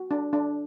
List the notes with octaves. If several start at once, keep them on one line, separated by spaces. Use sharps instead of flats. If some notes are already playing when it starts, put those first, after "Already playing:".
Already playing: F#4
D4
D4